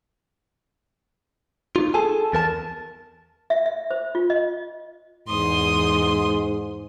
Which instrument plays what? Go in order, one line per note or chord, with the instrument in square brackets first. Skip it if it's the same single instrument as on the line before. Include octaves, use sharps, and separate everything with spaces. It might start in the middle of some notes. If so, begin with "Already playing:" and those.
[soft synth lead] D#4 [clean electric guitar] F4
[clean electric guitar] G#4 A4 G#5 [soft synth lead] A5
[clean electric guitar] E2 A#4 A5 [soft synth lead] A6
[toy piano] E5
E5
C5
F4
D#5
[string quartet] E2 C6 D#6 [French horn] G#2